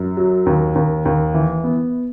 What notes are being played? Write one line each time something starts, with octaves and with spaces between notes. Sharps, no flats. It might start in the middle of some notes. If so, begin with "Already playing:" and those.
Already playing: F#2
F#3
D#2
D#2
D#2
E3
B3